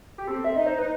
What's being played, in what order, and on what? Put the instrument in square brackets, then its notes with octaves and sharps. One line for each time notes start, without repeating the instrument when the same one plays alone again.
[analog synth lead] G4
[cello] C4 [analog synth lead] A4
[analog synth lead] E5
[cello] D#4 [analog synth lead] D#5
[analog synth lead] C5
B4